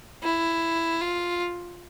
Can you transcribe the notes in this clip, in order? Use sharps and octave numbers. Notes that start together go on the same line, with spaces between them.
E4
F4